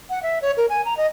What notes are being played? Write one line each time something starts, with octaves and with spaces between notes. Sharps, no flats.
F#5
E5
C#5
A#4
G#5
A#5
D#5